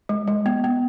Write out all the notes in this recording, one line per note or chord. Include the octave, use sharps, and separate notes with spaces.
G#3
G#3
B3
B3